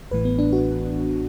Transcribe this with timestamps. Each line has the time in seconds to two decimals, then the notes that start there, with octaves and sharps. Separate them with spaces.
0.11 A1 A2 E3 B4
0.25 B3
0.39 D4
0.53 F#4